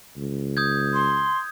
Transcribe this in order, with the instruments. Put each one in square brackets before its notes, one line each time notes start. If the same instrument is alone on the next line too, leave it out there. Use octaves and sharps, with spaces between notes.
[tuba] C#2
[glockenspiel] D#6 G6 G#6
[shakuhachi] C6